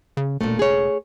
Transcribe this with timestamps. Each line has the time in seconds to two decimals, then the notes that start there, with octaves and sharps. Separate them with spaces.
0.17 C#3
0.41 E1 A#2 A3
0.59 G#4 C#5